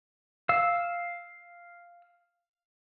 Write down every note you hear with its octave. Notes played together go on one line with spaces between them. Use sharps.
F5 E6